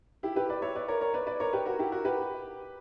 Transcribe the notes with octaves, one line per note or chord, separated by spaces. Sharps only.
E4 G4
G4 B4
B4 D5
C#5 E5
B4 D5
A#4 C#5
A#4 C#5
B4 D5
B4 D5
A#4 C#5
G4 B4
F#4 A#4
E4 G4
F#4 A#4
G4 B4